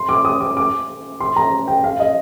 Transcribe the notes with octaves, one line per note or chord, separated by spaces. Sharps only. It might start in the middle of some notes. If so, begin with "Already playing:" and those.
Already playing: C6
D6
D#6
D6
D6
C6
A#5
G5
F5
D#5